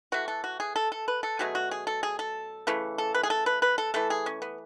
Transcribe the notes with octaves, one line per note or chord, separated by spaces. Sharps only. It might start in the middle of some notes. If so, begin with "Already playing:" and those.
E3 A3 F#4
A4
F#4
G#4
A4
A4
B4
A4
B2 F#3 A3 G#4
F#4
G#4
A4
G#4
A4
C#3 E3 A3
A4
B4
G#4
A4
B4
B4
A4
E3 A3 A4
G#4
C#4
B3